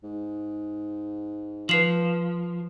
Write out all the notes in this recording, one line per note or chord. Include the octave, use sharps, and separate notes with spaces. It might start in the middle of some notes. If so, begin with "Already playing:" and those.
G#2
F3 B4 C7 F#7